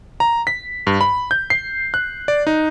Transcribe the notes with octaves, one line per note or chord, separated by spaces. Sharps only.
A#5
B6
G2
B5
G6
C7
F#6
D5
D#4